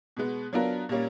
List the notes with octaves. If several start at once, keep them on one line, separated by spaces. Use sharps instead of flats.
B2 G#3 B3
F#3 B3 D4 F4 A#4
A#2 G3 A#3 C#4